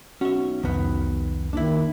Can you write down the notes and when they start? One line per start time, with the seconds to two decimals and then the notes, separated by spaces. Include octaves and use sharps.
0.21 B1 C#4 F#4 E5
0.63 C2 F2 D#3 B3
1.53 D#2 D#3 D4 E4